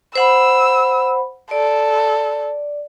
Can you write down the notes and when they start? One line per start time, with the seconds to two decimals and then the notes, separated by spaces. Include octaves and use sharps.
0.15 C5 F#5 B5 E6
1.51 A4 D5